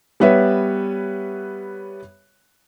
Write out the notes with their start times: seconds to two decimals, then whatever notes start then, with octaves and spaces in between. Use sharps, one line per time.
0.20 G3 B3 B4 C#5 E5